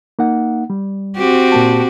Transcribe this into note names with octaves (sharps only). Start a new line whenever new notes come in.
A#3 D#4 F#5
G3
C4 F#4 G4
A#2 A#3 A5